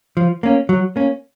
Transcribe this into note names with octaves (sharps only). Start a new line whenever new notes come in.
F3
A#3 C#4
F#3
A#3 C#4